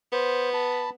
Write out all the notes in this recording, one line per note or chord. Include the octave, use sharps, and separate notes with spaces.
B3 C5
A5 B5